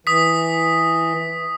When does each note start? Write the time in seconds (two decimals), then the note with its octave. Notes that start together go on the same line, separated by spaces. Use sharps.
0.07 E3 D#6 B6